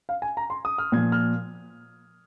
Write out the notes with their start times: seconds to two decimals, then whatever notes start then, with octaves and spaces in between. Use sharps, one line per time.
0.09 F5
0.22 G#5
0.37 A#5
0.50 C6
0.65 D#6
0.78 F6
0.92 A#2 G#6
0.96 F3
1.12 F6